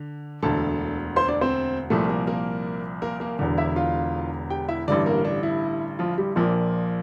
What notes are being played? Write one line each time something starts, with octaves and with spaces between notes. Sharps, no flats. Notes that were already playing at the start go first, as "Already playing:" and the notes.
Already playing: D3
E1 D2 D3 A4 A5
C5 C6
D4 D5
C4 C5
C2 A#2 F3 A3 A4
A#3 A#4
A#3 A#4
A#3 A#4
A#3 A#4
E1 E2 D3
E4 E5
F4 F5
G4 G5
E4 E5
A1 G2 D3 D4 D5
A#3 A#4
D4
E4
F3 F4
G3 G4
A#1 A#2 F3 A#3 A#4